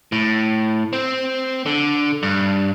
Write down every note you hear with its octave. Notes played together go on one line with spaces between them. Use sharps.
A2
C4
D3
G2